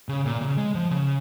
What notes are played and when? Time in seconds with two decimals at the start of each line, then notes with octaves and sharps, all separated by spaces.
0.09 C#3
0.26 A#2
0.42 C#3
0.58 G#3
0.75 F3
0.91 C#3